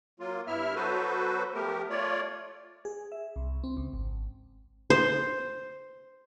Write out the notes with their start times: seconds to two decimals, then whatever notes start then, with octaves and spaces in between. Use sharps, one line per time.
0.20 F#3 A#3 F4
0.47 G2 B3 E4 E5 F6
0.75 F#3 B3 F#4 A4 B4 C5
1.54 F3 A3 B3 G4 A#4
1.90 A3 F4 C#5 D5
2.85 G#4
3.12 E5
3.36 C2
3.64 C4
3.77 C#2
3.93 G#1
4.90 C5